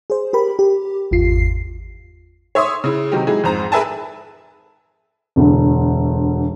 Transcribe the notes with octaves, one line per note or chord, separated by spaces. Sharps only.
G#4 C5
G4 A#4 B5
G4
G#1 E2 F4 C7
C#5 E5 C6 D#6
C#3 E4
C3 D#3 F#3 D#4 G4
F#3 G#3 D#4 E4 G#4
F2 G#2 C5 A#5
G#4 A#4 B4 E5 G#5 A5
E1 D2